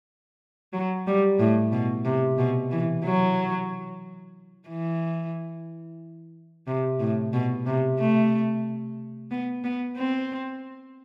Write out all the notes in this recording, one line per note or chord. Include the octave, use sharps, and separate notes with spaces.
F#3
G3
A2
B2
C3
B2
E3
F#3
E3
C3
A2
B2
C3
A3
B3
B3
C4